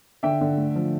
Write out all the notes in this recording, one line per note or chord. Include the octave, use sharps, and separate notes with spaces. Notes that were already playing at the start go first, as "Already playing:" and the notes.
D3 E5 G5
D3
A3
F3